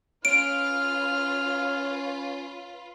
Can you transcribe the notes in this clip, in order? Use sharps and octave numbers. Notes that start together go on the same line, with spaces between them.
C#4 F4 B4 F6 D7